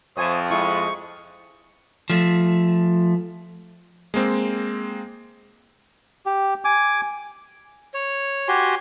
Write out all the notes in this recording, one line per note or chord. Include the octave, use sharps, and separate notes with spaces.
F2 C5 C#5 E5 G#5 A5 D#6
G#3 C4 E4 C#6 D#6
F3 A3
G#3 A#3 C4
G4
G#5 D6
C#5
F#4 G4 G#5 C6